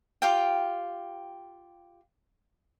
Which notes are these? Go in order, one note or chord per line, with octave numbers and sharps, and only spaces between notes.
F4 G4 F5 G5